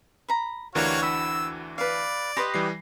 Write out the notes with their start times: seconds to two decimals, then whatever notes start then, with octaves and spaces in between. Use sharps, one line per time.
0.29 A#5 B5
0.75 D2 E3 D4 F#4 G4 A#4 C#5 F5
1.02 F#4 G5 B5 E6
1.78 B4 D5 F5
2.37 G4 B4 D#5 B5 C6 A#6
2.54 E3 G3 C7